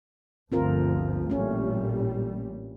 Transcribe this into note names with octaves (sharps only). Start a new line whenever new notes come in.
G1 D2 F3 C4 F4 A#4
A1 A#2 G3 A3 C#4